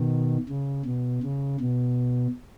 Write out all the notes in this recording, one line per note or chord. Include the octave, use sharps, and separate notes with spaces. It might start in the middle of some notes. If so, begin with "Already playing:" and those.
Already playing: B2 D#3
C#3
B2
C#3
B2